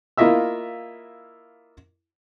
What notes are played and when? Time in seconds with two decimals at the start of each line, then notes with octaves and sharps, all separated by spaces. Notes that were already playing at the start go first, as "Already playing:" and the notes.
0.18 A#3 E4 F4 D#5 E5 E6